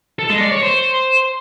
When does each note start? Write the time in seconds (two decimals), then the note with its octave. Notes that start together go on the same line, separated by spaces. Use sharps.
0.19 A4
0.30 G#3
0.41 D5
0.52 C#5
0.63 C5